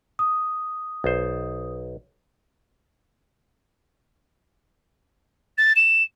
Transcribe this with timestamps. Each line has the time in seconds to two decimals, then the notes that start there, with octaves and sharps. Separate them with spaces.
0.19 D#6
1.04 B1 C5
5.57 A6
5.76 E7